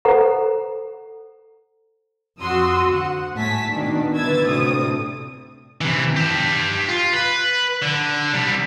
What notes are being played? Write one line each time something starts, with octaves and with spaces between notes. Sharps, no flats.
A4 C5 F#5 A#5
F2 F#4 C6 D#6 E6
D2 F#5
A2 A3 G#5 A5 B6
B2 D#3 D4
D3 E3 B4 E6 G#6 A6
D2 A2 C3 C4 D#6
C3 E3
G4 A5
F4
B4
D3
C3 G3